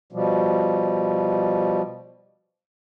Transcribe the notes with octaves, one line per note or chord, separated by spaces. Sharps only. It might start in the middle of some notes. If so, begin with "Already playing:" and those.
B2 F3 G3